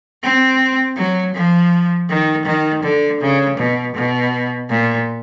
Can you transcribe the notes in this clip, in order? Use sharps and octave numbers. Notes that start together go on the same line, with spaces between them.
C4
F#3
F3
D#3
D#3
D3
C#3
B2
B2
A#2